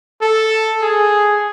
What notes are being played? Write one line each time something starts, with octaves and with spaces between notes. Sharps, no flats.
A4
G#4